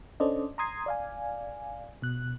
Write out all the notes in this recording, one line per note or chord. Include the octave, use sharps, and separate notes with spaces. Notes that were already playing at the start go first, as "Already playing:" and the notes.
C#4 D4 A4 C5 D5 D#5
A#5 C6 D#6 G#6 C7
D5 F5 G#5
B2 F#6